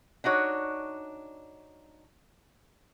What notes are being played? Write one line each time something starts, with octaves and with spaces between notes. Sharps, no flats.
D4 D#4 F#4 C#5